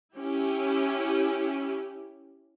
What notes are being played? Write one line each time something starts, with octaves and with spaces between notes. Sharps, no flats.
C#4 E4 G4